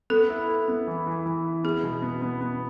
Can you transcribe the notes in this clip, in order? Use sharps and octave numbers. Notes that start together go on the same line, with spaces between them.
B3 A4
E4
E4
B3
E3
E3
E3
E4
B3 G#4
B2
B3
B3
B3